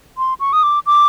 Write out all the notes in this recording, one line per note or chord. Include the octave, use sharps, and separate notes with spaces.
C6
C#6
D#6
D6
D6